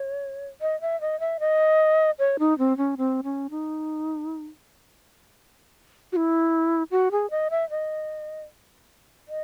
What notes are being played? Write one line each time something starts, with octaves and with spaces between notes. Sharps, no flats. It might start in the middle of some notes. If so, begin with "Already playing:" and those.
Already playing: C#5
D#5
E5
D#5
E5
D#5
C#5
D#4
C4
C#4
C4
C#4
D#4
F#4
E4
F#4
G#4
D#5
E5
D#5
D#5